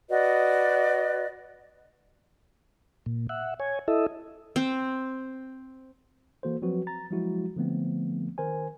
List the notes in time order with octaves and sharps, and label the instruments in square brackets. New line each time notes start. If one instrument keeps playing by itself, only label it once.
[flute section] F#4 B4 D5 D#5
[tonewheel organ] A#2
E5 F#5
C#5 G#5
E4 A4 D#5 E5
[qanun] C4
[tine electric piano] E3 A#3 F#4 A4 C5
F3 F#3 C4 F#4 B4
A#5 A6
F3 F#3 G#3 E4 F#4
D3 F3 A3 B3 C4
D#3 A#4 C5 G#5